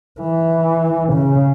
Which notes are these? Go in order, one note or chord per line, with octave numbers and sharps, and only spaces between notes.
E3
C#3